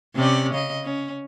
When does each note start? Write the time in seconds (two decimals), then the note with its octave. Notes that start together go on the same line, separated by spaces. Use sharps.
0.15 C3 C#4 D5
0.53 C#3 D#5
0.84 C#4